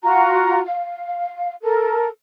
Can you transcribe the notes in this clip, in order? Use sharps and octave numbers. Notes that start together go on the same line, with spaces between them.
F4 F#4 A#5
F5
A4 A#4